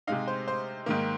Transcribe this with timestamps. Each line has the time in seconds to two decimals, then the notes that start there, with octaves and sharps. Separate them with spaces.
0.07 C3 G#3 D#4 F5
0.28 C5
0.48 C5
0.86 G#2 D#3 A#3